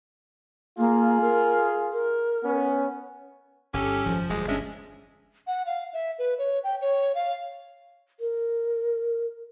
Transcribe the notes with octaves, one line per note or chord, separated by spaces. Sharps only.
A#3 F4 G#4
A#4
A#4
B3 C#4
G1 G2 C#4 G4 A4
G#1 F#2 F3
E1 D2 G3 G#3
G1 G#3 C#4 D4 E5
F#5
F5
E5
B4
C#5
G5
C#5
F5
A#4